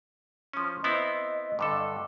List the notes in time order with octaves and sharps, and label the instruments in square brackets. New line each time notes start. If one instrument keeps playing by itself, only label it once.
[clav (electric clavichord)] F3 C#4
[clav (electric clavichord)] B3 C4 E4 [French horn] D#5
[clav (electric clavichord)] G2 D3 A4